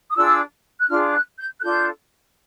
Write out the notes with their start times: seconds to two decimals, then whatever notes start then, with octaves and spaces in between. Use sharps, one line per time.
0.10 D#6
0.15 D4 F4 G#4 E6
0.79 F#6
0.88 D4 F4 G#4 F6
1.13 F#6
1.38 G6
1.59 F#6
1.62 D4 F4 A4 G6